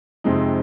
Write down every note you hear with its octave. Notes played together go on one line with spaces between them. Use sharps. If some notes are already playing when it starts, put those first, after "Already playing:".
F2 C3 G#3 C4 D#4